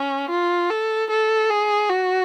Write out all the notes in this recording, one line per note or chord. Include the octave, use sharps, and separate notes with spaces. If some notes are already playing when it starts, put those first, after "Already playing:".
Already playing: C#4
F4
A4
A4
G#4
F#4